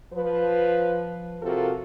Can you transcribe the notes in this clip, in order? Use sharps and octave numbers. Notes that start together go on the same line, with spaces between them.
F3 B4
C3 F3 F4 F#4 A4 A#4